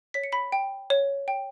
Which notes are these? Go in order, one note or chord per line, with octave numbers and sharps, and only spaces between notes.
C#5 B6
C#7
B5 B6
G5
C#5
G5